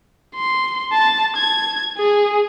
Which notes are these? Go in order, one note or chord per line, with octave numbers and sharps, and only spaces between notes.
C6
A5
G#6
G#4